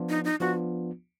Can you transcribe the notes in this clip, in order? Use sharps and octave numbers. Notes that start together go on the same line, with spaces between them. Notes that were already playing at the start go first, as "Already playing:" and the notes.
Already playing: F3 B3 D4 F4
D#4
D#4
F3 B3 D4 F4 F#4